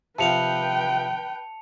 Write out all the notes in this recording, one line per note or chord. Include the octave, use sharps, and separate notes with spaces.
C3 F3 B4 F5 G5 A5 C#7 F7